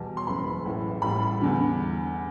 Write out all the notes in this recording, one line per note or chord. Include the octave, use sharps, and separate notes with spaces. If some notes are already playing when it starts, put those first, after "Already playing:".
Already playing: E2 B2 G3 A5
C6
F#1 F#2 E3 B5
A1 A2 E3
A1 A2 G3 B5
E2 D3 G3